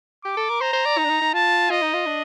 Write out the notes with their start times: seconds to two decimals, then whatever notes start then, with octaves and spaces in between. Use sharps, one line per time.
0.24 G4 D6
0.37 A4
0.49 A#4
0.61 C5 A#5
0.73 C5
0.85 D5
0.98 D#4
1.04 D4
1.09 D#4
1.22 D#4
1.34 F4 A5
1.70 F4 D#5
1.82 D#4
1.94 F4
2.06 D4